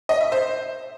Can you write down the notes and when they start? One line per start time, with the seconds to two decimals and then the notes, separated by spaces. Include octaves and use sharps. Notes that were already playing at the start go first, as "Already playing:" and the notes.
0.09 D#5
0.21 E5
0.32 C5